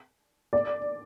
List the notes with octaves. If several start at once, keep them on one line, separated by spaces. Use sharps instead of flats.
D5